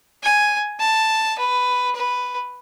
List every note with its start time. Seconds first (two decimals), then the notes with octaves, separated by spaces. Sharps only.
0.23 G#5
0.80 A5
1.39 B4
1.95 B4